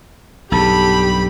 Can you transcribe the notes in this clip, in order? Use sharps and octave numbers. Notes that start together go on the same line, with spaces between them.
B1 G2 G4 A4 B5